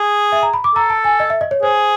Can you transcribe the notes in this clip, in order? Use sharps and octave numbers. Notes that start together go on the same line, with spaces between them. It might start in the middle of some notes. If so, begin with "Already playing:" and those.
Already playing: G#4
E5
A#5
B5
D6
A4 A#5
A5
G#5
D#5
E5
D#5
C#5
G#4 C5